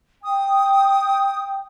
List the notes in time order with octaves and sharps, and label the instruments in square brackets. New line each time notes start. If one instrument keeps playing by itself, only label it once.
[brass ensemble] G5 [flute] D#6